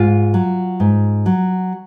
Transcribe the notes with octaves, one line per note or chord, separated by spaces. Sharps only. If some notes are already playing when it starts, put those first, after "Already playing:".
Already playing: G#2 F4
F#3
G#2
F#3